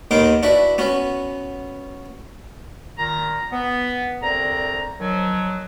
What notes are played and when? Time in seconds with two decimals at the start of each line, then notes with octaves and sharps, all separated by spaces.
0.11 D#2 B3 D#4 A#4 C6 D6
0.43 D4 E4 F#4 B4 B5
0.78 B3 C#4 F#4
2.98 A#2 D#3 A#5
3.52 B3
4.22 C2 D3 C4 A#5
4.99 D#3 F3 F#3